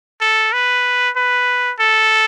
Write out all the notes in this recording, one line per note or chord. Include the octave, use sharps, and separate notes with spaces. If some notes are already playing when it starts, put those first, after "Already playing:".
A4
B4
B4
A4